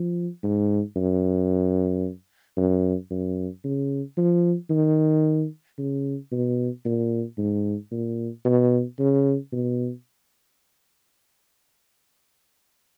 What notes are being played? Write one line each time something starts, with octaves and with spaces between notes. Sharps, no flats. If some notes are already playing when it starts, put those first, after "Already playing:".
Already playing: F3
G#2
F#2
F#2
F#2
C#3
F3
D#3
C#3
B2
A#2
G#2
A#2
B2
C#3
B2